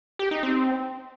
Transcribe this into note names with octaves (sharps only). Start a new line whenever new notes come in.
G4
D#4
C4